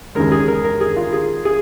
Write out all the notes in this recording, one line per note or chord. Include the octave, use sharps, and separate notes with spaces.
D#2 C#3 G#3 A#4
G#4
A#4
A#4
G#4
F4
G#4
G#4